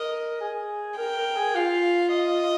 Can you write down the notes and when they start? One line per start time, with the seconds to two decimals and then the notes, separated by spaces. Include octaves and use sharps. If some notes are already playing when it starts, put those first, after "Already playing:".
Already playing: A#4 D#5
0.41 G#4
0.98 A#4 G5
1.17 A#4
1.36 G#4
1.55 F4 F5
2.12 D#5